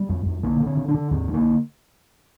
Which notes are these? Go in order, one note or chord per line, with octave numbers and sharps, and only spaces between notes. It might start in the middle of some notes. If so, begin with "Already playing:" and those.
Already playing: G3
F2
F2
D3 A#3
D3
C4
D3
D4
D3
D#2 C4
D3
A#3